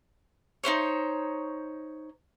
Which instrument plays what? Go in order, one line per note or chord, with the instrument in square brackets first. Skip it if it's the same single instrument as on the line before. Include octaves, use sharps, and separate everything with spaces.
[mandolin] D#4 E4 C5 C#5